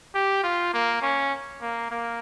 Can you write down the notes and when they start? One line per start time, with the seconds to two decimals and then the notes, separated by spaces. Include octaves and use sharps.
0.15 G4
0.43 F4
0.74 A#3
1.02 C#4
1.62 A#3
1.91 A#3